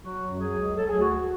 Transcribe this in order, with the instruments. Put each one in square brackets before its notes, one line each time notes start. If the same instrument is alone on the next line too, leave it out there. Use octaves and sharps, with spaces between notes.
[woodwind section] F#3 F#4
F#2
F#3 G#4
C#2
F#3 A4
G#4
D2
F#4